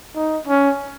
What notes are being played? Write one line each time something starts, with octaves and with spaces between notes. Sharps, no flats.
D#4
C#4